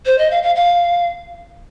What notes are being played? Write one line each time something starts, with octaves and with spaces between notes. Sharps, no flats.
C5
D#5
F5
F5
F5